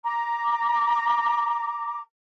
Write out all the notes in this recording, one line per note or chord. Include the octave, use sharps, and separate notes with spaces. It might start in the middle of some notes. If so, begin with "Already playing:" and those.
A#5 D6